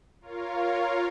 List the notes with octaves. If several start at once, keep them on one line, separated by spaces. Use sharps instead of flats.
F4 A#4 C#5 F5